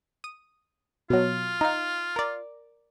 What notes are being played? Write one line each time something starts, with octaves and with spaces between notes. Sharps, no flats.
D#6
B2 F#3 F4
D#4 F5
A#4 D5